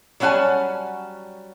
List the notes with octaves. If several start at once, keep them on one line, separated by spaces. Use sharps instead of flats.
F#3 G3 C#4 F#5 G#5 A5